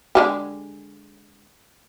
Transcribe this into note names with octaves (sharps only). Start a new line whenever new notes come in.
D3 G#3 G4